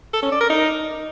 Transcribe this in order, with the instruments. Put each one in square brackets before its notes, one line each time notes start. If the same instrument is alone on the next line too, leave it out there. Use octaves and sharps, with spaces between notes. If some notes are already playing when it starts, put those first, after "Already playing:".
[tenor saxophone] A4
C#4
D5
A#4
D#4